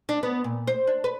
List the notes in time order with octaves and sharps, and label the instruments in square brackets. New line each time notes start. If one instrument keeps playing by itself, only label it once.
[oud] D4
B3
A#2
C5
D4
B4